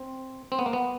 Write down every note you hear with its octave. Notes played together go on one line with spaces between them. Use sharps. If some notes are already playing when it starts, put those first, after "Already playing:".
Already playing: C4
C4
B3
A#3
B3